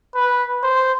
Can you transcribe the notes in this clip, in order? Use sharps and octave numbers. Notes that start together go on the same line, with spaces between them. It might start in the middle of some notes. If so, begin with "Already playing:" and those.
B4
C5